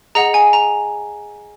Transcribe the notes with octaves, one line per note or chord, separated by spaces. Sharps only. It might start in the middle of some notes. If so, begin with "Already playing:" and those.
G#4 D#5 F#5 A#5
G#5
A#5